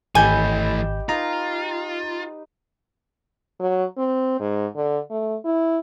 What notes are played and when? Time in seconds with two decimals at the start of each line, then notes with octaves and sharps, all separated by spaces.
0.15 G#1 E3 A3 G4 D#5 G#5 B5 G6
1.09 D#4 F4 B4 A#5
3.60 F#3
3.97 C4
4.39 G#2
4.76 D3
5.10 A3
5.45 E4